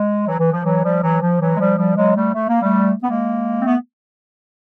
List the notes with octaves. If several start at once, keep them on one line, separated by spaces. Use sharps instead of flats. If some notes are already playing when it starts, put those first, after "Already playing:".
Already playing: G#3
E3 F#3
E3
F3
E3 F#3
F3 G3
E3 F#3
F3
E3 F#3
G#3
F3 G3
F3 G3
F#3 G#3
G3 A3
A3
A#3
G3 A3
B3
G#3 A#3
C4
A3 B3